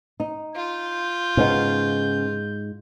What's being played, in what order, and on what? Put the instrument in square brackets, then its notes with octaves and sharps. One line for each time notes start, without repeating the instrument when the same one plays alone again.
[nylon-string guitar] D#4
[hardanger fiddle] F4 [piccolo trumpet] G6
[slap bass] G#2 [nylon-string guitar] C#3 B3 D#4